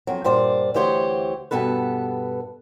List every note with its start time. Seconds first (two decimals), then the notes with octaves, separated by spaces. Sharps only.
0.07 F2 F#3
0.24 G2 A#2 C5 D5
0.74 D2 E3 G4 C5 C#5
1.51 G2 B2 B3 A4 B4